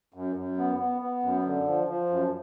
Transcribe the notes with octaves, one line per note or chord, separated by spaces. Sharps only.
F#2
F#2
B3
B3
B3
F#2
D3
F3
F3
F#2